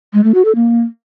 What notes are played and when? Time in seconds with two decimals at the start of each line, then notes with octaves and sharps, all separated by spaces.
0.13 G#3
0.24 A3
0.34 F#4
0.45 A4
0.55 A#3